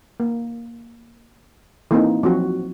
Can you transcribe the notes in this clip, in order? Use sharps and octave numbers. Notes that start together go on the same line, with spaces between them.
A#3
E3 A#3 C4 D#4
F3 F#3 C4 F#4